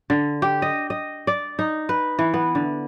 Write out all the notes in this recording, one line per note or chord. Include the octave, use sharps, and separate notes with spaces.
D3
G4
D#5
D#5
D5
D#4
B4
E3
B3
D3